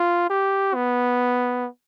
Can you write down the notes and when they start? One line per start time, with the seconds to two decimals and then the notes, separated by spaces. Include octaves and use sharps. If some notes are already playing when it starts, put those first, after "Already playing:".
Already playing: F4
0.30 G4
0.75 B3